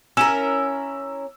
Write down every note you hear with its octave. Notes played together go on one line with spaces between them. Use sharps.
C#4 E4 A#4 E6 E7